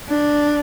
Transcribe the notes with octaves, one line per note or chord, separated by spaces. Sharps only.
D4